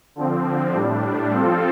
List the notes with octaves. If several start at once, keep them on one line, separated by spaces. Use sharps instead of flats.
D3 F3 C4
A2 G3 D4
F3 C4 F4 A4